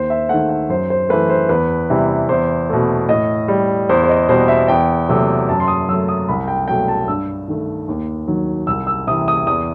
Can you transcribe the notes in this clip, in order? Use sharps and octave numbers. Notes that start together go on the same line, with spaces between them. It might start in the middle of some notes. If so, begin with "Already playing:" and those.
Already playing: D#2 C5
E5
D#3 A3 F#5
F#5
F#2 C5
C5
E3 A3 B4
C5
E2 B4
C3 E3 G3
E2 C5
B2 A3
A2 D#5
G3
E2 C5
C5
D#5
B2 G3 C5
E5
E2 G5
C3 F#3 A3
F#2 A5
C6
D#6
F#3 A3 E6
D#6
C2 B5
G5
B2 F#3 A3 G5
A5
G2 E6
D#3 A3
D#2
D#3 F#3
C2 E6
E6
C3 E3 D#6
D#6
E2 D#6